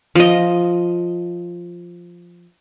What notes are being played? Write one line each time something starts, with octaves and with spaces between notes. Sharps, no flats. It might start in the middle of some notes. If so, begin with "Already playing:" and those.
F3 D#5